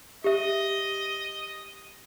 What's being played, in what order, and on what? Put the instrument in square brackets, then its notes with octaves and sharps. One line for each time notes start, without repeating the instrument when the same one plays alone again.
[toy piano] G4 E5 [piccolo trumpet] D#5